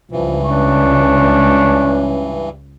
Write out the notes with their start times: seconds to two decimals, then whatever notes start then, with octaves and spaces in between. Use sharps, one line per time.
0.12 C#2 G2 E3 F3
0.46 C#4 D4 C#6